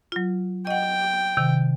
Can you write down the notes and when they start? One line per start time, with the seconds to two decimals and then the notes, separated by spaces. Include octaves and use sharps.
0.12 F#3 F4
0.67 D#5 F#5 G5
1.37 C3 D#3